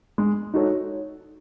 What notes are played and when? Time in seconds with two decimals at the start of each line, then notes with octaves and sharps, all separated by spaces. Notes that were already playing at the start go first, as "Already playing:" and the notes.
0.18 G#3
0.54 D#4 F#4 A4 C#5